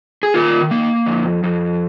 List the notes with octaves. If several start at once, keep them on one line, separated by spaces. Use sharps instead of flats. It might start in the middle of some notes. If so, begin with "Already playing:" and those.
G#4
D#3 F4 A#4
A#3
F2
F2